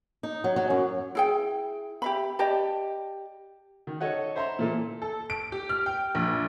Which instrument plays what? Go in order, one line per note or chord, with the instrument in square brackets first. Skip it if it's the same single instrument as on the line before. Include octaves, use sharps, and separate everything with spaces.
[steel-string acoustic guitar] D#4
F#3
F#3
F#2
[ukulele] E4 G#4 G5
G4 E5 B5
G4 D5 D#5 A5
[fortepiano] D#3
A4 C#5 D#5 F#5
C5 E5 A#5 C6
A#2 E3 A#3 A4
[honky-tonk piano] A4
D7
G4
F6
G5
A#1